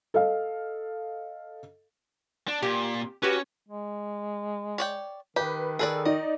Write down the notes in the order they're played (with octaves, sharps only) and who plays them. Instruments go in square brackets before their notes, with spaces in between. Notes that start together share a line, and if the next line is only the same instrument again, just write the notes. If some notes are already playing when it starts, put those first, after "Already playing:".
[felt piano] A4 D#5 F5
[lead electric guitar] D4
[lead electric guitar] A#2 [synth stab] G4
[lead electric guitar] C#4 [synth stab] F#4 G4 B4
[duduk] G#3
[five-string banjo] C#5 D5 G5
[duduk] D#3 [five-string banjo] G4 [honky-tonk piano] B4
[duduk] D#3 [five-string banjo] G#4 B4 D5 [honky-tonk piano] A4
[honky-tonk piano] D#4 D5 [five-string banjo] D#5